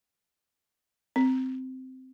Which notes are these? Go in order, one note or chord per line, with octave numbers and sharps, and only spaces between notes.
C4